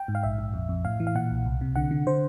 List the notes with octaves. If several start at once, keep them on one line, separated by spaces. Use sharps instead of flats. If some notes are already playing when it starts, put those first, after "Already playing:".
Already playing: G5
G#2
F5
A#1 E5
A#1
F2
F2
A2 F5
E3
F5
A#2 F#5
B1
C2
C3
D3 F#5
D3
D3 C5